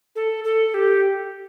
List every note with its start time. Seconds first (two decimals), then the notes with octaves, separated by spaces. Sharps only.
0.16 A4
0.44 A4
0.74 G4